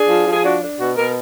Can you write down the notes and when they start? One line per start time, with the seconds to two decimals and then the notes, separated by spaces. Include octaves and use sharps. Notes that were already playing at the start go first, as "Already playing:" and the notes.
Already playing: D4 G#4
0.09 F3
0.26 F3
0.32 G#4
0.43 D4 F#4
0.61 D4
0.78 B2 F#4
0.96 B2 A#4